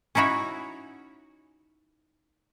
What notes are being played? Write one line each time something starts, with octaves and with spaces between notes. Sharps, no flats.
C#4 D#4 E4 F#4 C#5